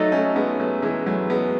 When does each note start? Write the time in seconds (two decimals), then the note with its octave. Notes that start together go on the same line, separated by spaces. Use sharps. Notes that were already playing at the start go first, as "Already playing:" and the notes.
Already playing: F#3 A3 D#4 A4 D#5
0.12 A3 C#4
0.36 G#3 B3
0.60 F#3 A3
0.82 E3 G#3
1.06 F#3 A3
1.30 G#3 B3